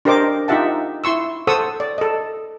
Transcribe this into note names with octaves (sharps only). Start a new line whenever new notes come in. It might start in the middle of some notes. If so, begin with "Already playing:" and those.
D4 G4 A#4 C5 D#5 D6
D#4 F4 G4 E5 F#5 A5
E4 C6 C#6 E6
A4 C5 F#5 C#6 D#6 E6
D5
A4 D#5